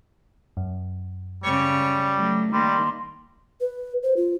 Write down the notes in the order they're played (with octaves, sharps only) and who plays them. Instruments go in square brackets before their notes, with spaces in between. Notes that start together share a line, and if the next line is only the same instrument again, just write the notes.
[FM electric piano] F#2
[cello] C#3 C#5 [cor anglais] G3
[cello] F#3 A3
[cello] D#3 A#3 [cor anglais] G3 [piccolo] C6
[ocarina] B4
C5
F4